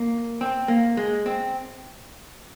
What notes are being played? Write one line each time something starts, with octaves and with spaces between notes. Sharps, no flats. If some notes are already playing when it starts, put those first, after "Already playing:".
Already playing: A#3
C4
A#3
G#3
C4